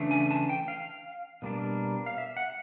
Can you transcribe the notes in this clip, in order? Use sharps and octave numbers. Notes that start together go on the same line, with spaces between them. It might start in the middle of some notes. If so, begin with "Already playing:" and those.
Already playing: C#3 E3 A3 D4
G#5
A5
G5
F5
B2 G3 A#3 D4
F5
E5
F#5